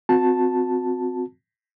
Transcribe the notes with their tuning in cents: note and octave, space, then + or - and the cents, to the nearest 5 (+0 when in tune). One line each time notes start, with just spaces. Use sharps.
C4 -20 F#4 -30 A5 +0